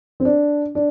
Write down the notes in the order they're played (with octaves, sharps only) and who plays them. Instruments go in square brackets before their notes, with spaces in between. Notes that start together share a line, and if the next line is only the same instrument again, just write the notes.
[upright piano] C4
D4
D4